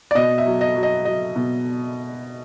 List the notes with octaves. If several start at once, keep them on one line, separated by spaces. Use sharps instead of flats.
D5
B2 D#5
E5
F#3
D#5
F#3
D#5
F#3 D#5
B2